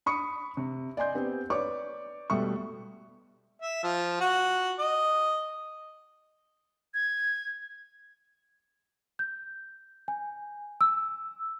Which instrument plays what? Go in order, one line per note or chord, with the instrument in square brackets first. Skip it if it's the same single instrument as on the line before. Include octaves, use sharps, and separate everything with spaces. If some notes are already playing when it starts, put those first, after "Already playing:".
[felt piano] B5 C#6 D#6 C#7
C3
D5 D#5 G#5 C6 G6
B3 C4 G4
B4 C#5 D5 C#6 D6
B2 G3 A3 E5 C#6
[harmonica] E5
F3
F#4
D#5
[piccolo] G#6
[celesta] G6
G#5
E6